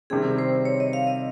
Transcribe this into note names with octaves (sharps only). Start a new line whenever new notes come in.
C3 D#3 G3 C4 G#4
C5
C#5
D#5
F5
D#5